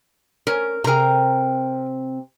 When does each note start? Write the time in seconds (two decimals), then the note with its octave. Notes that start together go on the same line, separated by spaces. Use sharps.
0.47 C#4 A#4
0.84 C3 G#4 A#4 A#5